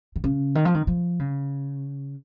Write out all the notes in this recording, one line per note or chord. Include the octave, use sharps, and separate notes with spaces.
D#3
C#3
D#3
F3
D#3
F3
C#3